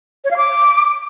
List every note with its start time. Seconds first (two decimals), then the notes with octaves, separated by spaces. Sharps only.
0.24 C#5
0.31 F5
0.37 D6